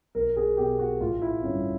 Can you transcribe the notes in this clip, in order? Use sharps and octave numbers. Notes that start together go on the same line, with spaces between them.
B1 A#4
G#4
B2 G4
F#4
A1 F4
E4
G2 D3 C#4